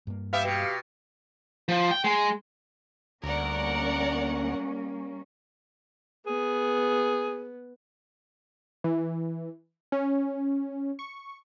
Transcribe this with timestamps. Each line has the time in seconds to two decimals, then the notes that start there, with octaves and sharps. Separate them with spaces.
0.07 G2 A#3
0.33 B3 G4 E5 F5
0.45 B2
1.68 F3
1.91 G5
2.04 G#3
3.24 D2 G3 A#3 C#4 A#4 D5 F#5
6.26 B3 G#4
8.84 E3
9.92 C#4
10.99 C#6